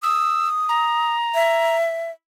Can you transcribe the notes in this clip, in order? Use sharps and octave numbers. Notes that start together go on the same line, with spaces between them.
D#6 E6
A#5
E5